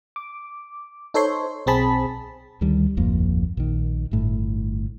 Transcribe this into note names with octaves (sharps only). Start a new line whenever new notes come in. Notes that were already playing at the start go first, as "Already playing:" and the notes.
D6
D#4 A4 C5 C#5 C6
B1 C4 G#4 A5 B5
D2 D#3 G3
D1 G#1 F2 A#3
A#1 D#3
G1 A2